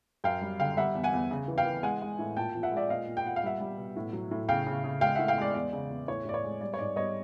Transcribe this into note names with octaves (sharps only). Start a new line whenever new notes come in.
F#2 F5 G5
G3
D3 F5 G5
G3 E5 F#5
E2
F#5 G#5
E2
C#3
E3
F5 G5
E3
G#3 F#5 G#5
G#3
A2
A#2 G5 A5
F3
E5 F#5
G#3
D5 E5
A#2 D#5 F5
A#2
G5
A#2 F#5
F5
G3 E5 F#5
G3
B2
A2
F#3
A2
C#3 F5 G5
C#3
C#3
G#3 F5 G5
A2 E5 F#5
F5 G5
G#3 D5
E2 D5
C#3
E2
A2 C#5
A2 D5
C#5
G#3
G3 D5
C#5
G#2 D5
G3 C#5 D#5